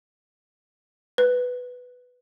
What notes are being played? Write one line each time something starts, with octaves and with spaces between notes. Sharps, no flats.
B4